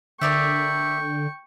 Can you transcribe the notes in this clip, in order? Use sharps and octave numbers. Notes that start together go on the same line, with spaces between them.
D3 A#4 D5 E5 G5 C#6